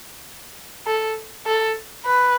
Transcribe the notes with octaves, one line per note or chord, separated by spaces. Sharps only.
A4
A4
B4